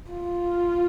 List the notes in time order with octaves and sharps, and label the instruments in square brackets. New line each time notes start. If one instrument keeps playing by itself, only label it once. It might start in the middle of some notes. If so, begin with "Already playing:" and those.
[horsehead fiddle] F4